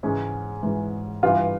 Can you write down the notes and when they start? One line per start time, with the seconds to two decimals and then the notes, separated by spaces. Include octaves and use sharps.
0.03 G#2 E3 G#3 C#4
0.63 G#2 E3 G#3
1.23 G2 E3 G3 F4